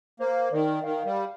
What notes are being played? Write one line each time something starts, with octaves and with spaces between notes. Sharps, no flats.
A#3 C5
D#3 D5
D#3 F5
G3